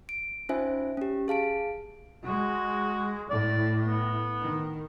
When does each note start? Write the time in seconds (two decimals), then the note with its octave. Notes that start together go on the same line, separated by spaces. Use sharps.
0.09 D7
0.49 C#4 D#4 F4 C5 E5 G#5
0.97 C#4 G4
1.28 G#4 F5 A5 D7
2.25 G#3 F#4
3.30 A2 D5
3.87 B3
4.41 D#3